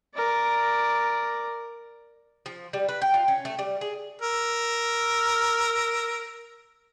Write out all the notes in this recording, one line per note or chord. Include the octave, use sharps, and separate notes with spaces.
A#4 D5
F3
G3
B4
G5
F4
C#4
A3
G3
G#4
A#4 E6